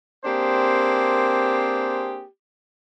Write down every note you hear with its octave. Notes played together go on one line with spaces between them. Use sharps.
A#3 C4 D4 G4 G#4 C5